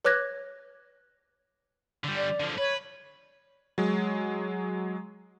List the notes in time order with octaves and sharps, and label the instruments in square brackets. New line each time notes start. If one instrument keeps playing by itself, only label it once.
[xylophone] B4 C#5 D6 F#6 G#6 A#6
[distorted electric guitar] D3 G3
[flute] D5
[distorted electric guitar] D3 F3
[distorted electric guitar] B4 [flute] C#5
[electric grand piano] F#3 G#3